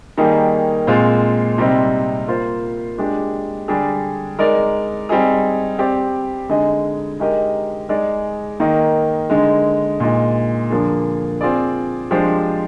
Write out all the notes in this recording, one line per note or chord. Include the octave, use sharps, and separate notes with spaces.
D#3 G3 A#3 D#4 G#4
A#2 G#3 C4 F4 C5
C3 G3 C4 D#4
A#3 F4 C5
G#3 D4 G4
D3 G3 D4 G#4
G#3 D#4 A#4 D5
G3 C4 D#4 G#4
C4 G4 D5
D3 G#3 D#4 G#4 D#5
G#3 D#4 G4 A#4 D#5
G#3 D#4 G#4 D5
D#3 A#3 D#4
D3 G#3 D#4
A#2 G#3 D#4
D3 F3 A#3 D4 G#4
C4 F4 G#4 D5
F3 G#3 D4 G4 C5